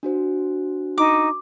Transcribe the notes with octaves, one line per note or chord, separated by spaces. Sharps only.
D4 F#4 C5
D#4 D6